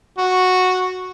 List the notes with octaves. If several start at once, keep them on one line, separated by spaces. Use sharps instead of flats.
F#4